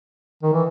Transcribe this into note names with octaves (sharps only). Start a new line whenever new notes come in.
D#3
E3